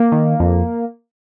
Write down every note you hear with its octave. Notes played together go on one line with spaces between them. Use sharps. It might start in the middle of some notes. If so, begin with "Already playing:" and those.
Already playing: A#3
D#3
F2